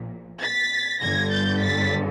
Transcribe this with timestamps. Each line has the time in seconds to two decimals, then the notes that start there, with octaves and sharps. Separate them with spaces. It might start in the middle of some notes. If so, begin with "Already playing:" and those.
Already playing: A#1 A#2
0.41 A6 B6
1.01 G1 G2 D3 G#6 A#6
1.31 G6 A6
1.61 A6 B6